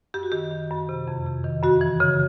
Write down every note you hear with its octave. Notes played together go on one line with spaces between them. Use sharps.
F#2 G4
F#4
D#3 G4
D#3
F#2
C3
F2
C3
D#3
F#2 F#4
E3
C#3